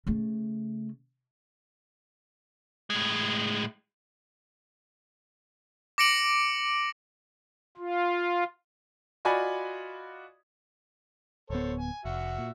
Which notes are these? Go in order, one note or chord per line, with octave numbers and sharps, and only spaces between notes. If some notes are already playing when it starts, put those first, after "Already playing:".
C#3 A3
A2 G#3
D6 A#6 C#7 D7 F#7
F4
F4 F#4 D5 D#5 G#5 B5
D1 B3 A4 C5 C#5
G#5
F1 F#4 E5 F#5
A#2